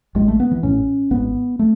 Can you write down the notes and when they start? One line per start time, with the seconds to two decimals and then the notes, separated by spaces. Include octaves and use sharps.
0.15 A1 A2 G#3
0.28 A3
0.40 B3
0.51 E3
0.63 A1 A2 C#4
1.11 G#1 G#2 B3
1.59 A3